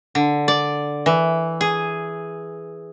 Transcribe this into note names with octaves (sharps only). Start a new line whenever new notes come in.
D3
D5
E3
G#4